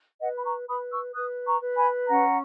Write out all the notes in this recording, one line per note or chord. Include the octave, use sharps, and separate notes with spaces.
B4 D#5 F#5
B5
A#5 C#6
B4 B5 D#6
C#6 E6
B4 D#6 F#6
A#5 C#6
B4
G#5 B5
C#4 F#5 A#5